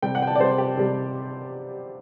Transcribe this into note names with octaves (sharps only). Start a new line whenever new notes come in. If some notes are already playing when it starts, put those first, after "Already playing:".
C3 G3 G5
F#5
G5
A5
D5
C3 G3 C5
G4
C3 G3